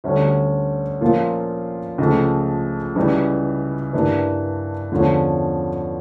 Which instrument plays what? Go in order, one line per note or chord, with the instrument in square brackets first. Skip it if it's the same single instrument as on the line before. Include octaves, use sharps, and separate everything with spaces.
[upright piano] D2 D3 G3 C#4
A#2 F3 A#3 C#4 F4
C#2 C#3 F3 A3
C#2 C#3 E3 G3
G2 E3 A#3 D4
E2 D3 F3 C#4